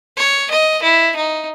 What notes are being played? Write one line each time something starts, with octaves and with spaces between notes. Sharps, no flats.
C#5
D#5
E4
D#4